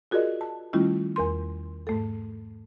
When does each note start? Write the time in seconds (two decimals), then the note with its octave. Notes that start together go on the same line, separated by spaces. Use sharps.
0.11 F4 F#4 G#4 A#4 D5 D#5
0.41 A5
0.73 D#3 G3 A3 C#4 E4 F4
1.16 E2 A#4 C6
1.87 G#2 A3 A4